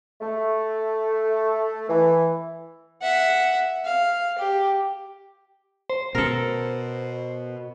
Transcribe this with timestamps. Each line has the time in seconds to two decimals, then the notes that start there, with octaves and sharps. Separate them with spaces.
0.21 A3
1.89 E3
3.02 E5 F#5
3.85 F5
4.38 G4
5.90 C5
6.15 B2 A4 A#4